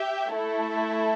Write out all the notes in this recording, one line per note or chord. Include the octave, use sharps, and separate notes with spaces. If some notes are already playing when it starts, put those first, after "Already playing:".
Already playing: G4 E5 G5
A3 E4 A4